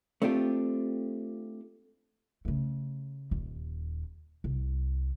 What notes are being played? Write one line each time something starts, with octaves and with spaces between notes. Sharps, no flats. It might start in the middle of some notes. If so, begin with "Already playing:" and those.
A3 C4 D4 F4 G4
C#3 A3
D#1 D#2
C2